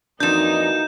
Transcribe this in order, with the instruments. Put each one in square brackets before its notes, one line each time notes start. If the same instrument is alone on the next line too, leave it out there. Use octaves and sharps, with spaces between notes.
[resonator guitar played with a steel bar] F2 D4 [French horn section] E3 A#3 F#4 [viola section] D#4 [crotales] G6 E7